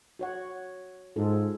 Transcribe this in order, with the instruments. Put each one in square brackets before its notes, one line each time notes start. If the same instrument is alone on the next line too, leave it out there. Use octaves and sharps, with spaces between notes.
[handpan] F#4 C#5 F#5
[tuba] G#2 [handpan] F4 G#4 A4